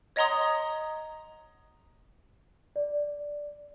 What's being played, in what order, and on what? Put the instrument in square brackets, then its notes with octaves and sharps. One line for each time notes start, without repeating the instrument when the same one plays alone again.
[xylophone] C#5 D#5 F#5 A#5 C6 D#6
[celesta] D5